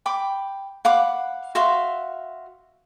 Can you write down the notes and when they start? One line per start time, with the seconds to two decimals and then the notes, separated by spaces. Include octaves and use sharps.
0.06 G5 B5 D6
0.85 F5 F#5 B5 D6
1.55 F#4 E5 F5 C6